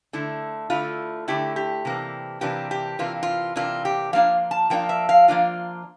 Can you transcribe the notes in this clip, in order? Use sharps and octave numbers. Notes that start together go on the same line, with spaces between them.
D3 A3 E4
D3 A3 E4 F4
D3 A3 E4 G4
G4
C3 E3 A#3 D4
C3 E3 A#3 D4 G4
G4
C3 E3 A#3 D4 F4
F4
C3 E3 A#3 D4 F4
G4
F3 A#3 D4 F4 F5
A5
F3 A#3 D4 F4 G5
E5
F5
F3 A#3 D4 F4